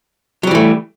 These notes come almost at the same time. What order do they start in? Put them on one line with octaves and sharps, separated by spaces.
F#3 G3 E3 A3